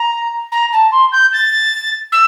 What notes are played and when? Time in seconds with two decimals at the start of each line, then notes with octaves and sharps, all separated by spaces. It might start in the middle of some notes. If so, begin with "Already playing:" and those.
Already playing: A#5
0.52 A#5
0.72 A5
0.92 C6
1.12 G6
1.33 A6
2.12 E6